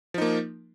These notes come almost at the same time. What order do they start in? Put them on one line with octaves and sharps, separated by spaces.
F3 D#4 A#3